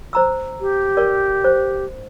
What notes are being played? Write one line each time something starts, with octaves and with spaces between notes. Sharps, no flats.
C5 A#5 E6
G4
A#4 D5
C5